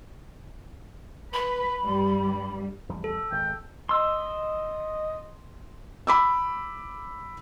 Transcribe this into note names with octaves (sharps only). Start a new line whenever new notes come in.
B4 B5
G2 G3
F1 E2 G3
A4
G#1 G#2 G5
D#5 C6 E6
B5 D6 E6